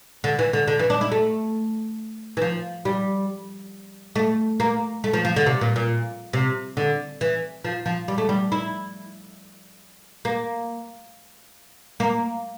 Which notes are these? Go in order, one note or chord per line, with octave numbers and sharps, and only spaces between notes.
D3
E3
D3
D3
E3
D4
E4
A3
E3
F3
G3
A3
A#3
A3
F3
F3
D3
C3
A#2
A#2
C3
D3
E3
F3
F3
G3
A3
G3
E4
A#3
A#3